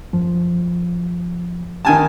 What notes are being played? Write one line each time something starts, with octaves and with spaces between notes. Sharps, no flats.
F#2 F3
D#3 G#5 A5